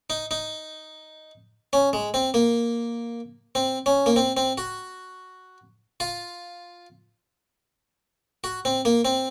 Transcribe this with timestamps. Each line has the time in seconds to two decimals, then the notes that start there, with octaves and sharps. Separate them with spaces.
0.10 D#4
0.31 D#4
1.73 C#4
1.93 G#3
2.14 C4
2.34 A#3
3.55 C4
3.86 C#4
4.06 A#3
4.16 C4
4.37 C4
4.58 F#4
6.00 F4
8.44 F#4
8.65 C4
8.85 A#3
9.05 C4